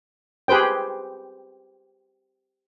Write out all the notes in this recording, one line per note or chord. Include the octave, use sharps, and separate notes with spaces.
G4 G#4 B4 C5 G5